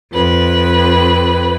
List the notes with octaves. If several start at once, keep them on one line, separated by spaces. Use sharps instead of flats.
F2 B4